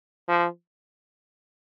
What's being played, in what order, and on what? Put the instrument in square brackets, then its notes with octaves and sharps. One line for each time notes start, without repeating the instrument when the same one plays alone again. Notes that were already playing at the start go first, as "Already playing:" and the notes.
[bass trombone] F3